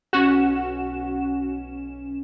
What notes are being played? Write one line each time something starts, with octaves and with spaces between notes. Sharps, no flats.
B1 C#4 F#4 E7